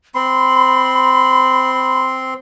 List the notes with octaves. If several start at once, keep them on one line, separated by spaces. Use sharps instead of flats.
C4 B5 C6